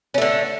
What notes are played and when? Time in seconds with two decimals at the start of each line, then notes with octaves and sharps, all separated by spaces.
0.14 C#4
0.18 A3
0.22 D3